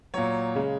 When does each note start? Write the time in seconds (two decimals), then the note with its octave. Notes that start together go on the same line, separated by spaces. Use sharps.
0.14 A#2 F#3 C#5
0.55 C#3 G#3